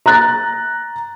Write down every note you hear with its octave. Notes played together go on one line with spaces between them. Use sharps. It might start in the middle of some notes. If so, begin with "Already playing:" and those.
A#5 F#6 A6